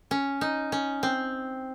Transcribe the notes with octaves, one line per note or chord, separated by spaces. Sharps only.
C#4
D#4
C#4
C4